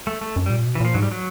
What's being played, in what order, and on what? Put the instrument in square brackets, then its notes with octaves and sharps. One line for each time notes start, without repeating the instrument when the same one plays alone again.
[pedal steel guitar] A3
A3
[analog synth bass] F#2
[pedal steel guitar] G3
[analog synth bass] A#2
B2
[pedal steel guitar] E3
[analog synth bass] A#2 [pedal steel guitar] F3
[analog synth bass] G#2 [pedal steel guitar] F#3
[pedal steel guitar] G3
F#3